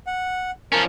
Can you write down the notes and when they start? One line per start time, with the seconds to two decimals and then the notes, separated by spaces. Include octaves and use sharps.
0.07 F#5
0.72 F3 C#4 A#4 A5